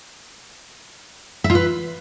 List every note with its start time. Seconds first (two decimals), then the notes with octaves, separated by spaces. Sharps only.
1.44 E5
1.50 F4
1.55 B4